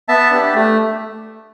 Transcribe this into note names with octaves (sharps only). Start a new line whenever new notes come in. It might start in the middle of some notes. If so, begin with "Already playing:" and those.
B3 E5 A5
D4 G4
A3